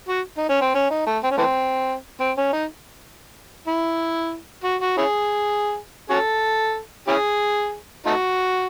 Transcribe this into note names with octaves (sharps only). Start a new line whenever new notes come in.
F#4
D#4
C#4
C4
C#4
D#4
A3
C4
C#4
E3 A3 C4
C4
C#4
D#4
E4
F#4
F#4
C#4 E4 G#4
C#4 F#4 A4
C#4 E4 G#4
A3 D#4 F#4